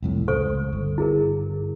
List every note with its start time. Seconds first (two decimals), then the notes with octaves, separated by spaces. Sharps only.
0.03 C2 F2 A2
0.28 C#2 A4 C5 C#6
0.73 G1
0.98 E4 G#4 A#4